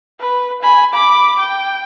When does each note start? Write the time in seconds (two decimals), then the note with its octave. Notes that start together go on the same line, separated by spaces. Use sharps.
0.21 B4
0.63 G#5 B5
0.93 B5 D6
1.39 G5